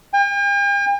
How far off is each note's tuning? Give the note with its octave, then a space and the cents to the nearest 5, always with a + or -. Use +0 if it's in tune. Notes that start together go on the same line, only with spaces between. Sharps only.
G5 +45